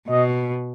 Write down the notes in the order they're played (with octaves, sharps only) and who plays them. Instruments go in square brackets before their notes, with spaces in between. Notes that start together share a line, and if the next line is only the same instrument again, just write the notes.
[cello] B2 [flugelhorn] D#5